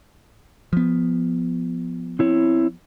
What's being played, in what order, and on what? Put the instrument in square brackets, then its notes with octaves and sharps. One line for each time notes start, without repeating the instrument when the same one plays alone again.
[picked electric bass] F3 B3
[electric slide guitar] C4 E4 C#5